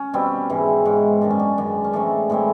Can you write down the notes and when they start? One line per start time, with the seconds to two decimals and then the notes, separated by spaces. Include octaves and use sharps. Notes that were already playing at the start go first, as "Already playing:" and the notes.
Already playing: C#4
0.13 B2 G3 C4
0.50 G#2 E3 G#3
0.85 G#2 E3 G#3
1.21 F#2 D#3 G#3 D4
1.30 C#4
1.39 D4
1.58 F#2 D#3 G#3 D4
1.84 C#4
1.93 A2 E3 G#3 C4 D4
2.30 A2 E3 G#3 C4